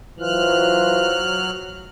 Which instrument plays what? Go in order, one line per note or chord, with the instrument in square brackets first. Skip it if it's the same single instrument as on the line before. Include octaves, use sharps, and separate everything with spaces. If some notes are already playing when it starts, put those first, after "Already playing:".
[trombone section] E3 F4 C5 [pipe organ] F#3 F6 F#6